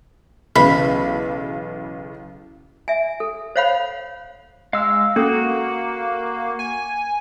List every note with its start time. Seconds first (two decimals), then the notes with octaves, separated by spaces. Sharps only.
0.56 B1 C#3 E3 B5
2.88 E5 G#5
3.20 A4
3.56 C5 C#5 F5 F#5 B5
4.73 G#3 F5 E6
5.16 A#3 C#4 F#4 A4
6.59 G#5